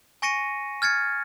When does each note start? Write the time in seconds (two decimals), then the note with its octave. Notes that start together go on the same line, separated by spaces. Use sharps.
0.22 G#5 C#6 A#6 C#7 D#7
0.82 F6 G#6 A6 C#7